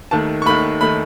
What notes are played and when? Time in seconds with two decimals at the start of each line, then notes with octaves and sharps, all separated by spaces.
0.11 D#2 D#3 A3 A5
0.42 C#6
0.46 D#2 D#3 A3 B5
0.81 D#3 A3 B5